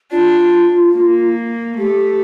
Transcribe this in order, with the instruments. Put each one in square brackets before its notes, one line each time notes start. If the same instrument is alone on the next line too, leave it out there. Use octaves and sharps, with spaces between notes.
[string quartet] D4 [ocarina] F4
[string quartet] A#3
[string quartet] A3 [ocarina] G4